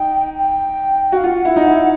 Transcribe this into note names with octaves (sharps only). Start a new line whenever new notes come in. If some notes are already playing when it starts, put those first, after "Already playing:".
Already playing: D#4 G5
G5
F#4 F5
F4 F#5
E4
D#4
E4